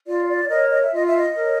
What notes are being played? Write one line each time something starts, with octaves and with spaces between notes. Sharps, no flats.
F4 D5
D5
A#4 C#5 D#5
D#5
E5
F4 D#5
E5
D#5
A#4 C#5